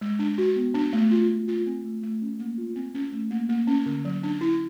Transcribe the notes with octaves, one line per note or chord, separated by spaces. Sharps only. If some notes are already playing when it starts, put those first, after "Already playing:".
G#3
D4
F#4
B3
D4
A3
F4
F4
F4
C4
A3
A3
C#4
A#3
F4
C4
C#4
A3
A#3
A#3
C#4
D3
F#3
D4
E4